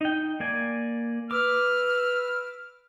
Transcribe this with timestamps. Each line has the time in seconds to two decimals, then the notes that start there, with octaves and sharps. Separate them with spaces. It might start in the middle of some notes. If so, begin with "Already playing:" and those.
0.01 D#4 G5
0.40 A#3 D5 G#5
1.31 B4 D6 E6 F6